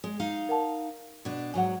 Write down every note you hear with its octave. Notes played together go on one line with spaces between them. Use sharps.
G#3
D#4 F5
A#4 F#5 A5
B2 D4
G#2 F#3 F#5 G#5